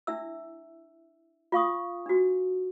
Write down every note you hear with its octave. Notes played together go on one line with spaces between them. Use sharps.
D4 E4 E5 E6
F4 F5 C#6 D#6
D4 F#4